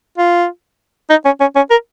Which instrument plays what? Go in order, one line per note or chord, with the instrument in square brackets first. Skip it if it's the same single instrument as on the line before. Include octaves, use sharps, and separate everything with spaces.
[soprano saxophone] F4
D#4
C#4
C#4
C#4
A#4